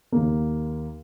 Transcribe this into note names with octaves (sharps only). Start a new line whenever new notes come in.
D#2 A#3